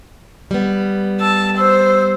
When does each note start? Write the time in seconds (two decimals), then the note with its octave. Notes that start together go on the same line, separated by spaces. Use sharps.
0.51 G3 B3
1.20 A5 E6
1.57 C5 E6